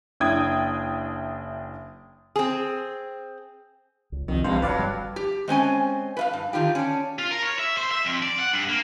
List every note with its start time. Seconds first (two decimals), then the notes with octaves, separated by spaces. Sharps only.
0.20 F#1 D4 E4 G5 D#6 G#6
2.36 C4 G#4
4.12 C#2
4.28 C2 F2 D#3
4.44 E2 G2 G#3 A#3 C4 D4 C5
4.62 G#1 F2 F#3 B4 D5 F5
4.76 G1 G3
5.16 G4
5.48 G#3 C4 C#4 G#5
6.17 B4 E5 F5
6.33 G2
6.53 D3 D#3 F4 G4
6.75 C#4 D4
7.19 F4
7.31 A#4
7.43 C#5
7.59 E5
7.77 C5
7.91 E5
8.05 F2
8.22 D5
8.39 F#5
8.53 G2
8.69 A#3